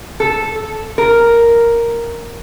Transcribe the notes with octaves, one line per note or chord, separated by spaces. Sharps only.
A4
A#4